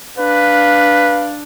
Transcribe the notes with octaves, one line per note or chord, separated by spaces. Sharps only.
D4 B4 F5